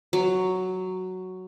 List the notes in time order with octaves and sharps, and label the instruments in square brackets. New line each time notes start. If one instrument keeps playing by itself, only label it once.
[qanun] F#3